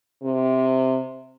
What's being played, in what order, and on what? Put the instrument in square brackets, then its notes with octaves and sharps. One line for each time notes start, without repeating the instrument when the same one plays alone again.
[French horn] C3